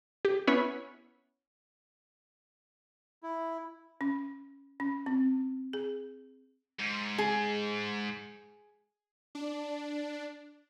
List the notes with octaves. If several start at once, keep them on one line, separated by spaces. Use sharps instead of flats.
G4
B3 C#4 E4 B4 C#5
E4
C#4
C#4
C4
G#4
G#2
G#4
D4